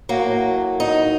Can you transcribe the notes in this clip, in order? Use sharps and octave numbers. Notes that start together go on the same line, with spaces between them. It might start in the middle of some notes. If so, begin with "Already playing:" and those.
A2 F#3 A#3
D#4